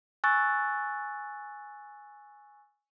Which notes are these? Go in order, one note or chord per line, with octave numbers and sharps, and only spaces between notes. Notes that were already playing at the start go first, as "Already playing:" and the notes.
G#5 C#6 E6 F#6 A6